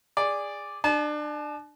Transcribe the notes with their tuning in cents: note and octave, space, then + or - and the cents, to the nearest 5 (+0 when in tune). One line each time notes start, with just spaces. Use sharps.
G#4 -20 D5 +0
D4 +30 A5 -35